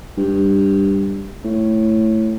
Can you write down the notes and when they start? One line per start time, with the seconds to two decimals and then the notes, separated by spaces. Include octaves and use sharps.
0.17 G2
1.45 A2